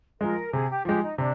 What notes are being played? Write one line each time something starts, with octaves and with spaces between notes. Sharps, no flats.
F3 G#3 A#4
C3 G#4
G4
F3 G#3 G4
D#4
C3 D4